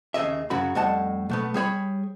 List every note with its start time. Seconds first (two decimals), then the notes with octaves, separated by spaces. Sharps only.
0.14 D#2 C#3 G#4 D#5 E5
0.50 F#2 C#3 F#3 F#4 B5
0.75 F2 A2 G3 D#5 F#5 A5
1.29 B1 A3 B3
1.54 G3 G#4 C#5 B5